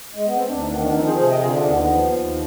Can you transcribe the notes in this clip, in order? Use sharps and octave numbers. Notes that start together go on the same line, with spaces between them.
G#3
B3
C4
D2 D4
C4 D#4
D#3 B3 D4
B3 D4
F3 C4 D#4
G#4 C5
C3 G#4 C5
D#5 G5
D3 F4 G#4
D4 F4
D#2 B3 D4
B3
F3
D#2